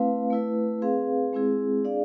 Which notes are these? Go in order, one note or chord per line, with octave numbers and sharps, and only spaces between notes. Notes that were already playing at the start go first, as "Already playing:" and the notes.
Already playing: A3 C4 E4 B4 F5
A3 E4 B4
C4 G#4 B4 F5
G#3 C4 E4 G#4
D4 G#4 D5 F5